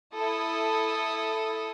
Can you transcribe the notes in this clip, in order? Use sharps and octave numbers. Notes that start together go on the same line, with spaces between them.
E4 A4 D#6